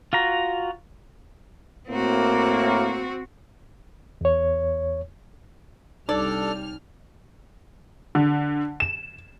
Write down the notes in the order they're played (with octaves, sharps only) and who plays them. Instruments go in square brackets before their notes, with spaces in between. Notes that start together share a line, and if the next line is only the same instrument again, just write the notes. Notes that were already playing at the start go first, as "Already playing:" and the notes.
[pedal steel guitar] F4 F#4 A#5
[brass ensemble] A2 A#3 [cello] C4 F#4
[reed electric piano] E2 C#5
[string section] C2 G3 F6 [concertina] D4 A4 [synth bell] D#4 [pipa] D5
[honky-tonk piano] D3
E7